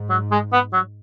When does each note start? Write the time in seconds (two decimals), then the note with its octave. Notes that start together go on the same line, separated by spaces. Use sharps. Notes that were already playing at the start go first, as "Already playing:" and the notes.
Already playing: G#2
0.10 F#3
0.31 G#3
0.53 B3
0.73 F#3